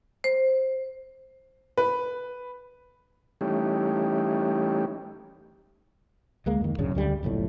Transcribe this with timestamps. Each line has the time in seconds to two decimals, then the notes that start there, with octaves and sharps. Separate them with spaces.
0.24 C5
1.78 B4
3.41 E3 G3 A3 C#4 D#4 G4
6.46 D2 G#3 A#3
6.61 F2 D#3
6.78 D1 F#2 C#3 D4
6.95 D2 D3 G3
7.23 F#1 B1 F2 A2